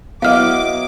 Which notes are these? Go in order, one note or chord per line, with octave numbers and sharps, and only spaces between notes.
F#3 B3 E4 D#5 F5 D6 F6